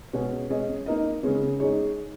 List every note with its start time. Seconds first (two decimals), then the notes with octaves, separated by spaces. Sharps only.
0.13 B2 G#3 C#4 G#4
0.50 G#3 C#4 G#4 D#5
0.86 A#3 D#4 A#4 D#5
1.23 C#3 G#3 C#4
1.60 G#3 D#4 G#4 C#5